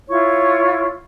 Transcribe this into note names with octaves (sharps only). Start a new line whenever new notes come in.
E4 F4 C#5 C#6